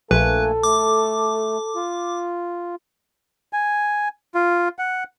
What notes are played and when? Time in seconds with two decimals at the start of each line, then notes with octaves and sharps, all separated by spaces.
0.11 A#1 A3 A#3 A4 B4 G#5
0.63 A3 D6
1.76 F4
3.53 G#5
4.34 F4
4.79 F#5